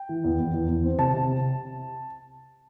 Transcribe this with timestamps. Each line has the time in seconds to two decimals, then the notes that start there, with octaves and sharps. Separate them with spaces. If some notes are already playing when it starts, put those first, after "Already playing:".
Already playing: G5
0.09 E3
0.24 E2
0.39 E2
0.54 E2
0.68 E2
0.84 C4
0.98 C3 A5
1.14 C3